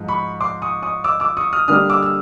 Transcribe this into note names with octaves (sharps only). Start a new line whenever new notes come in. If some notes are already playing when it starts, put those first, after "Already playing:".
Already playing: G#2 F3
B5 C#6
C6 D6
C#6 D#6
C#6 D#6
D6 E6
D6 E6
C#6 D#6
D#6 F6
D3 G3 A#3 D4 D#6 F6
D6 E6
E6